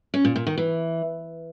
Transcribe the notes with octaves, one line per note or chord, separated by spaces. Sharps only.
C#4
A#2
A#2
D#3
E3